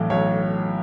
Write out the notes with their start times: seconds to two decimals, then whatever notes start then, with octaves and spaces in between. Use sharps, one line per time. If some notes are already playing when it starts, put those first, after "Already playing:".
Already playing: B1 A2 E3
0.10 B1 C#5